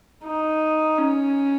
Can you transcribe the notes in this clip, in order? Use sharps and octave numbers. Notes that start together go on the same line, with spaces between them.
D#4
C#4